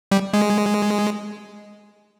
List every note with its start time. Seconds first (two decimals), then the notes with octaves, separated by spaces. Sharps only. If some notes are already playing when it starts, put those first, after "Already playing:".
0.12 G3
0.33 G#3